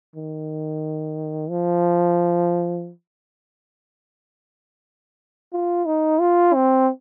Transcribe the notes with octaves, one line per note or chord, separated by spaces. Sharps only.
D#3
F3
F4
D#4
F4
C4